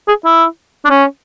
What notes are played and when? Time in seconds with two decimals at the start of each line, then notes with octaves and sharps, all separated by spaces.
0.08 G#4
0.25 E4
0.85 D4
0.90 C#4